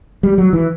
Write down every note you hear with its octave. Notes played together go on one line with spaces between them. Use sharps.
G3
F#3
E3